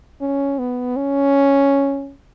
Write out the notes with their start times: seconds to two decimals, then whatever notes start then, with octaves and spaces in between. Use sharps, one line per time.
0.21 C#4
0.59 B3
0.96 C#4